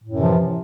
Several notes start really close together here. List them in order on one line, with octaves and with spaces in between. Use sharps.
A2 F#2 C3 E3 F3